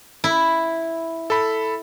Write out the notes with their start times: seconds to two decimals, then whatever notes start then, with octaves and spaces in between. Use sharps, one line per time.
0.24 E4
1.30 A4 B5